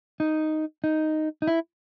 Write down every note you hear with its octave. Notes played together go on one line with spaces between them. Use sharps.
D#4
D#4
D#4
E4